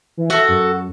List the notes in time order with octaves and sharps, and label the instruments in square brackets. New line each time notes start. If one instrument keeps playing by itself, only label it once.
[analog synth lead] E3
[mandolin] F#4 A4 [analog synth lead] E5
[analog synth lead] F#2